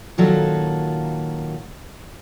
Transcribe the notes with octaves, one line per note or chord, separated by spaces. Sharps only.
A#2 D#3 F#3 F4 F#4 A4